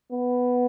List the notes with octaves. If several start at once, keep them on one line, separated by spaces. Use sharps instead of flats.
B3